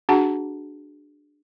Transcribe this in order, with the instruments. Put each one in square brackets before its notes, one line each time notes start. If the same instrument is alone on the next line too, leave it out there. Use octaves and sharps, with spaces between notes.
[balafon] D4 F#4 G#4 F#5 A5 A#5